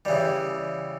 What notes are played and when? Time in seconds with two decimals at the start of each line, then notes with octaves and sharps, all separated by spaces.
0.05 C#3 E3 G3 D5